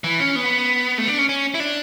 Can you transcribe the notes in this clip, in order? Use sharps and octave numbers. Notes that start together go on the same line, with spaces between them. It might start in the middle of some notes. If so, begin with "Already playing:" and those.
E3
C#4
B3
A3
D4
C#4
C#4
E4
D4